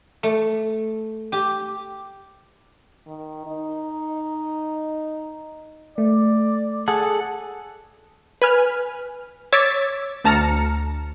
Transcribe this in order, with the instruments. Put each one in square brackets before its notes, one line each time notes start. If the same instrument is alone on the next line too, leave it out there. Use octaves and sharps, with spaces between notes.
[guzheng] A3
G4
[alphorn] D#3
D#4
[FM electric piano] A3 [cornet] D5
[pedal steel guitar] G#4 A4 F#5
[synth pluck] B4 G#5 F6
C#5 D6 E6 G#6 A6 B6
D2 A5 A#5 F6 C#7